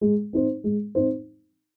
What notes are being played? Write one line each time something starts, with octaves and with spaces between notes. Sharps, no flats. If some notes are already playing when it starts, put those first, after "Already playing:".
G#3
C4 D#4 C5
G#3
C4 D#4 C5